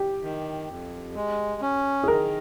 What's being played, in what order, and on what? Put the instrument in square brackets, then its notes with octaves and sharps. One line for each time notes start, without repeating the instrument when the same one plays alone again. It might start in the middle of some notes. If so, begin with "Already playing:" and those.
Already playing: [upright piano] G4
[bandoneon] D#3
F2
G#3
C#4
[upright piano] G#4
[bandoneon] D#3 [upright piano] A#4